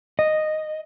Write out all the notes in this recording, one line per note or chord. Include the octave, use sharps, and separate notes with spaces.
D#5